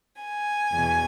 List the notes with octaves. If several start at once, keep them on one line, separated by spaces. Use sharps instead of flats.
G#5
E2 B2